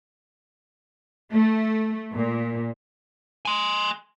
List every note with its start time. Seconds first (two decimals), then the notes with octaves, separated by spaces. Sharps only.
1.33 A3
2.14 A#2
3.45 G#5 C6